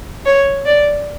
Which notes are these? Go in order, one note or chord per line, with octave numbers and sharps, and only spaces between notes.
C#5
D5